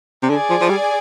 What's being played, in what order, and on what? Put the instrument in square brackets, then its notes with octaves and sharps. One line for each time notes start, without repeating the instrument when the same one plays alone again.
[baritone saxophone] C3
[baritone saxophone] D3 [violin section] G#4 D5 G#5
[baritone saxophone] F3
F3
G3